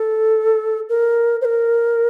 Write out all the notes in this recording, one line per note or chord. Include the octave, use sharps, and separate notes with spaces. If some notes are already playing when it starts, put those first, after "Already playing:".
Already playing: A4
A#4
C5
A#4